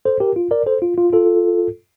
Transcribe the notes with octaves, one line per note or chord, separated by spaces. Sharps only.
A4 C5
G4 A#4
F4
A#4 D5
A4 C5
F4
F4
F4 A4